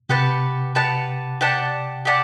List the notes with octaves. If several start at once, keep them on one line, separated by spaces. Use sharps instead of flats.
C3 G4 B4 F#5 A5
G4 B4 F#5 A5
G4 D5 F#5 A5
G4 D5 F#5 A5